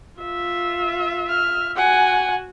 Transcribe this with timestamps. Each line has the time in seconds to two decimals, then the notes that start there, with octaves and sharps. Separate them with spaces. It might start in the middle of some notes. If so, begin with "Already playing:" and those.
0.21 F4 E5
1.29 F6
1.76 F#4 F#5 G#5